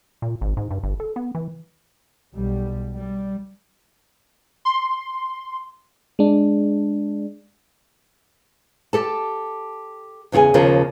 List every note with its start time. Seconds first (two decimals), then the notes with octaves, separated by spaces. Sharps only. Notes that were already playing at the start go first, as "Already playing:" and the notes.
0.22 A#2
0.41 G#1
0.57 G#2
0.71 G2
0.83 G1
1.00 A4
1.16 B3
1.35 E3
2.34 B1 G3
2.95 G3
4.65 C6
6.19 G#3 D4
8.93 G4 A4 A5
10.32 E2 C#3 F4 G#4 G#5
10.54 D#2 C#3 F3 F4 A#4 A5